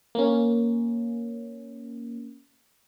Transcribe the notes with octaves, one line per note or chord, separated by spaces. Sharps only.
A#3 C#4